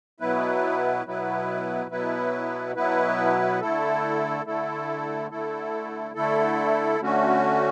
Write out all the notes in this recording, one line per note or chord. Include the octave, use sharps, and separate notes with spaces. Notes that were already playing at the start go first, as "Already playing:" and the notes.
B2 F#3 B3 E4 B4
B2 F#3 B3 E4 B4
B2 F#3 B3 E4 B4
B2 F#3 B3 E4 B4
D3 A3 E4 A4
D3 A3 E4 A4
D3 A3 E4 A4
D3 A3 E4 A4
D3 A3 C#4 F#4